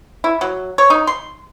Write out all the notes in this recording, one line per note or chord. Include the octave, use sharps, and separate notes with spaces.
E4
F#3
C#5
D#4
C6